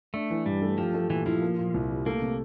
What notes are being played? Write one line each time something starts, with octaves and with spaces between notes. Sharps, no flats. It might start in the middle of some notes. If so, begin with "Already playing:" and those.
A3 D4
E3
G2 G3
A3
F3 G4
A3
A#2 E3
F3 E4
A#3
A#2
C2
G3
A3 A#3
C3